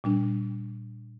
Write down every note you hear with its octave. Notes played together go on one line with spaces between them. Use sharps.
A#2 G3 D4